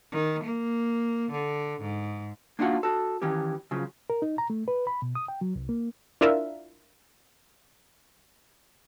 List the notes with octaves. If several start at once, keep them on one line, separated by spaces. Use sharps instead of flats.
D#3
A#3
D3
G#2
A#3 D4 D#4 F4 F#4 F#5
F#4 A4
D#3 E3 C#4 G4
C#3 F3 F#3
A#4
D#4
A#5
A3
B4
B5
B2
D#6
G5
F#3
C2
A#3
D4 E4 F4 A#4 E5